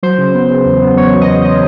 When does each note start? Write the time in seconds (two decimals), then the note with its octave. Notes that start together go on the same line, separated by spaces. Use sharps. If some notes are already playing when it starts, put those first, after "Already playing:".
0.03 F#3 C5
0.18 C#3
0.34 B3
0.50 C#3
0.66 E2
0.82 B3
0.97 E2 C#5
1.13 F#3
1.21 D#5
1.29 B3
1.45 F#3 D#5